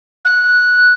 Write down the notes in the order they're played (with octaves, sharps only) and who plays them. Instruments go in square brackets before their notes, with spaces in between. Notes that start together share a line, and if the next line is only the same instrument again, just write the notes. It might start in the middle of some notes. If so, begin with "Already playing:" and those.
[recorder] F#6